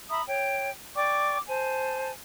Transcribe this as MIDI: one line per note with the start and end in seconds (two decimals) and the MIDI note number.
0.10 0.22 76
0.10 0.22 82
0.10 0.22 83
0.10 0.22 87
0.27 0.70 73
0.27 0.70 79
0.95 1.39 74
0.95 1.39 79
0.95 1.39 85
0.95 1.39 86
1.47 2.12 72
1.47 2.12 80
1.47 2.12 81